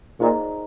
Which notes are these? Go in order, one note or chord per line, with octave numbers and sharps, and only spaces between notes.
A#2 D#4 G#4 C5 D#5 A#5